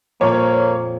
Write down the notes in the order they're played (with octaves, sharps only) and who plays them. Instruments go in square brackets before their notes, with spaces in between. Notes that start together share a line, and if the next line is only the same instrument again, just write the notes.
[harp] F2 A#2 D#7 [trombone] A#3 [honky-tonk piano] C#5